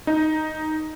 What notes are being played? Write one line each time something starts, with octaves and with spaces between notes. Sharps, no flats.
D#4